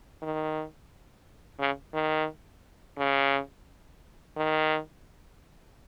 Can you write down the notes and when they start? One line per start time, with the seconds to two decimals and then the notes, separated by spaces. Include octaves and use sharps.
0.22 D#3
1.60 C#3
1.94 D#3
2.98 C#3
4.37 D#3